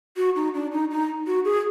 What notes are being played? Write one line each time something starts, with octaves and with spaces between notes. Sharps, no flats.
F#4
D#4
D4
D#4
D#4
F#4
G#4